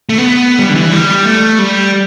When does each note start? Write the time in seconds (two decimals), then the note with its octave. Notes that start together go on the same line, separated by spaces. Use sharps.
0.09 A3
0.18 B3
0.59 G3
0.69 D3
0.75 E3
0.93 G3
1.25 A3
1.59 G3